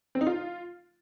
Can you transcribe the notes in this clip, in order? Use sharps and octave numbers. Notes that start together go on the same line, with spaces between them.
C4
D#4
F4